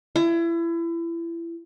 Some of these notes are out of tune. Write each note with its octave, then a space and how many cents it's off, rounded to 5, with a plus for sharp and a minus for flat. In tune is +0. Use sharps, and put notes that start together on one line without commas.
E4 +30